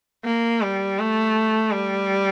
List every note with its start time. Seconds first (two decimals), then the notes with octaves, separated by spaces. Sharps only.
0.24 A#3
0.62 G3
0.99 A3
1.71 G3